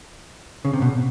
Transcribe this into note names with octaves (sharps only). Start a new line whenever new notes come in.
C#3
C3
B2